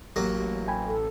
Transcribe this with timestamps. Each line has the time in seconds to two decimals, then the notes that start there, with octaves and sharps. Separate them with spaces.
0.16 A1 F#3 A#3 G4
0.68 G5 G#5 B5
0.86 A4